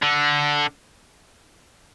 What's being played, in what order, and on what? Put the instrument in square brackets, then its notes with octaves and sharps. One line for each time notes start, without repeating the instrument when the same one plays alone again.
[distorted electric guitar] D3